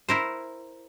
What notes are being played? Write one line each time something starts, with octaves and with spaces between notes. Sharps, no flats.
E4 A#4 C5